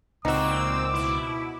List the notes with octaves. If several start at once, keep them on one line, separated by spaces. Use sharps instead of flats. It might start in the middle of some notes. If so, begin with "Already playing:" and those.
C#2 A#2 C4 D#4 F#4 D6 E6
B2 E4